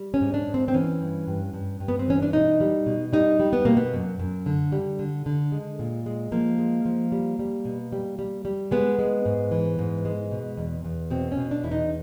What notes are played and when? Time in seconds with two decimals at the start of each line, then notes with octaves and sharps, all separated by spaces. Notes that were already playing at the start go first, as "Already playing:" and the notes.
Already playing: G3
0.14 C#4
0.21 G#2
0.34 D4
0.47 G#2
0.54 C4
0.68 C4
0.74 E3 C#4
1.01 G2
1.27 G2
1.53 G2
1.80 G2
1.88 B3
1.99 C4
2.07 E3 C#4
2.22 D4
2.33 B2 D#4
2.61 G3
2.86 B2
3.13 G3 D#4
3.40 G3
3.53 B3
3.65 B2 A#3
3.77 B3
3.94 F#2
4.19 F#2
4.46 D3
4.72 G3
4.99 D3
5.26 D3
5.52 G#3
5.79 A#2
6.06 G#3
6.32 F3 A#3
6.59 G#3
6.85 F3
7.12 G3
7.39 G3
7.65 B2
7.92 G3
8.19 G3
8.45 G3
8.71 G#3 B3
8.99 G#3
9.25 G#2
9.51 E3
9.79 G#2
10.05 G#3
10.31 B2
10.57 E2
10.85 E2
11.11 B2 C4
11.32 C#4
11.37 B2
11.51 D4
11.64 E2 E4
11.72 D#4